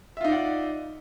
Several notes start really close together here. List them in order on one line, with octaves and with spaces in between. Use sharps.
E5 F4 D#4 D5 F#5